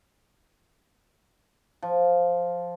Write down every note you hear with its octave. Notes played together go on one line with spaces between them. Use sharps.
F3